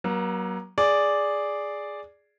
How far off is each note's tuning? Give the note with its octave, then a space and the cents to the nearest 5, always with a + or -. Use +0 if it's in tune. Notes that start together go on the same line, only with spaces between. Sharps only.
F#3 +20 A#3 +40
G#4 +0 D5 -5